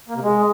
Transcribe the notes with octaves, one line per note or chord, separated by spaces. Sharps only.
A#3
C3
G#3